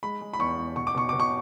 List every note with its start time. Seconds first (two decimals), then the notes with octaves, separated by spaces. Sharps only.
0.03 G#3 B5
0.21 G#3
0.33 B5
0.39 E2 C#6
0.58 E2
0.76 B2 C#6
0.87 D6
0.95 B2 C#6
1.09 B2 D6
1.20 C#6